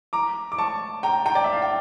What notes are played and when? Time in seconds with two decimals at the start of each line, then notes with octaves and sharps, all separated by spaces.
0.13 A#5 D6
0.52 D6
0.58 A5 C#6
1.03 G5 A#5
1.26 G5 A#5
1.35 D5
1.44 E5
1.53 F5
1.62 G5